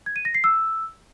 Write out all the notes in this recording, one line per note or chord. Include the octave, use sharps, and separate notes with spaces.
G#6
D#7
A#6
C7
E6